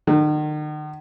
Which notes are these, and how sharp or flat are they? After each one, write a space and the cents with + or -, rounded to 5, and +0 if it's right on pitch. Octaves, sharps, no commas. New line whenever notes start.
D#3 -40